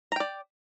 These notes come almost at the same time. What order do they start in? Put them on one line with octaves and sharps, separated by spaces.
A#5 G5 D5